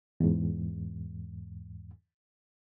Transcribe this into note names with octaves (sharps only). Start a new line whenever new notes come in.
E2 G#2